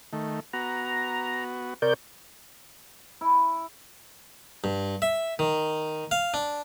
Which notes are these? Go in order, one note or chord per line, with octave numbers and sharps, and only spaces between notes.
D#3 A3
B3 F#4 A#5
C3 A#4 C#5 D5 G6
E4
G2
E5
D#3
F5
D4